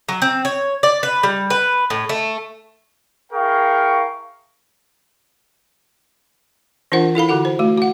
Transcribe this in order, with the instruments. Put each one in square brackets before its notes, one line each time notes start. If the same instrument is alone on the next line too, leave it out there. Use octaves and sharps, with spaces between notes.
[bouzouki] F#3
C4
C#5
D5
B4
G3
B4
A2
A3
[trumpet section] E4 G#4 A#4 F5 G5 C#6
[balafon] E3 D4 F4 A#4 C5 F#5
E4 A4 F5 B5
D3 F#4 A4 F#5
C5
A3 F#4
F#4 F#5